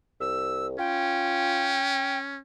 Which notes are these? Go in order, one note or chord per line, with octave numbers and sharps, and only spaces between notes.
C2 E6
C#4 F4 G5